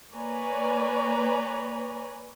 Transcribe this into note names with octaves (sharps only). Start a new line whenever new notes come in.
A#3 B4 C#5 D5 G#5 A#5